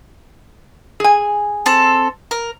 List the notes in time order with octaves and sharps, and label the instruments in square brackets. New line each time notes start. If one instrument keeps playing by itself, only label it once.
[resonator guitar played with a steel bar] G#4 G#5
[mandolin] C4 A4 A5
A#4